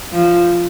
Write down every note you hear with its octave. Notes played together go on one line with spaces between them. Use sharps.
F3